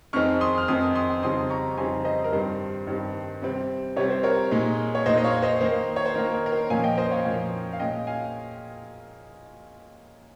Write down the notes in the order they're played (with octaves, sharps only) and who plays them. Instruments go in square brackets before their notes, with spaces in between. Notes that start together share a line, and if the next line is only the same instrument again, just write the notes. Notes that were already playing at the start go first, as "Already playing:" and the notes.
[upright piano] F2 D#3 G#3 C4 D#4 C#6 F6
C6 D#6
F6
F2 D#3 G#3 C4 D#4 C6 D#6
C6 D#6
F2 C#3 G3 C4 D#4 C6 D#6
A#5 C#6
F2 C#3 G3 C4 D#4 G#5 C6
C5 D#5
A#4
G2 D#3 G3 C4 C5
G2 D#3 G3 C4
C3 G3 C4
C3 G3 C4 C#5
C5
A#4 C#5
A#2 G#3 D#4
C#5
A#2 G#3 D#4 C5 D#5
D#5
C#5 F5
C5 D#5
D#3 A#3 D#4 C5
C#5
C5
D#3 A#3 D#4 A#4
A#4
A#4
C5
A#2 F3 A#3 C#4 F5 G#5
D#5 G5
C5 D#5
C#5 F5
A#2 F3 A#3 C#4
F5
A#2 G#3 C#4 D#5 G5
F5 G#5